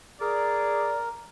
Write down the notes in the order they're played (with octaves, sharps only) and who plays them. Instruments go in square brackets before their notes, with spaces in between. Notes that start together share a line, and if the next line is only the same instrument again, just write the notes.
[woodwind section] G#4 D5 [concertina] A#4